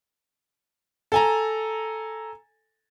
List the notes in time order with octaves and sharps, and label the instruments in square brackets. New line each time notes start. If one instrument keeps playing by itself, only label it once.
[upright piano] A4 G#5 A#5